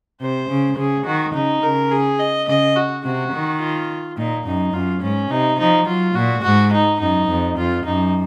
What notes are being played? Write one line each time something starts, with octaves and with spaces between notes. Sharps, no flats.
C3 C5
C#3
C#3 G#4
D#3 F#4
C#3 D#4
C#3 A#4
G#4
D#5
C#3 D#5
F#4
C3 F#4
D#3
F4
A#2 D#4
F#2 D#4
F#2 F4
G#2 C#4
C3 D#4
F3 D#4
F#3 F4
A#2 F#4
G#2 F#4
D#4
F#2 D#4
F2
F2 F4
F#2 D#4